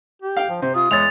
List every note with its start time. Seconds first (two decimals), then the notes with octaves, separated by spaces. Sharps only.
0.22 G4
0.37 F5 G5
0.50 F3
0.62 C3 C5
0.75 F4 D#6
0.91 E2 E3 G#3 C#5 A6 F7